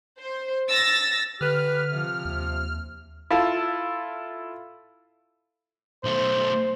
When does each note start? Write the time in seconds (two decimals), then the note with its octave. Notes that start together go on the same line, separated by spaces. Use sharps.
0.20 C5
0.70 E6 A6 A#6
1.41 D3 G4 B4 F6
1.91 C3 F3
2.25 D#2
3.30 E4 F4 A4 F5 A5
6.04 B1 A3 C5